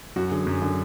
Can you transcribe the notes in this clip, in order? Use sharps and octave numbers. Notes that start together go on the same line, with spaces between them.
F#2 F#4
D3 G#4
F#2
D3